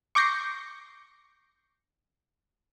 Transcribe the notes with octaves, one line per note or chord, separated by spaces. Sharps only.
C#6 D6 G6 A#6 C7 C#7